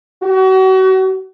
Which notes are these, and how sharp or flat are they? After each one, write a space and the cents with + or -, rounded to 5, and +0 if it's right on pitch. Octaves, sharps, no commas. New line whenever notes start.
F#4 +35